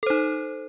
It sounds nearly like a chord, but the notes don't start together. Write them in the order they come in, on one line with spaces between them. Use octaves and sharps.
A4 C5 D#4